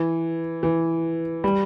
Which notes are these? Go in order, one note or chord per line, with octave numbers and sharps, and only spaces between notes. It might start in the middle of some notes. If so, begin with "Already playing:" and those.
Already playing: E3
E3
G3